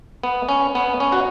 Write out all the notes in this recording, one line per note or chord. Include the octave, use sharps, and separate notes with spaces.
B3
C#4
B3
C#4
F#4